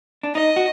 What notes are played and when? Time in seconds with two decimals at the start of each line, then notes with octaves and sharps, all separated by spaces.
0.23 D4
0.35 D#4 D#5
0.56 F#4